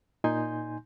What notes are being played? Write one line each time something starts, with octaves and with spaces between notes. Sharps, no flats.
A#2 D#4 G#5 C6 G6